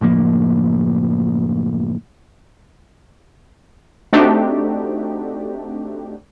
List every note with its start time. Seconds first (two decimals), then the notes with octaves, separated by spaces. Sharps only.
0.01 F#1 A2 F3 A#3
4.13 A3 C4 D4 D#4 F#4 G4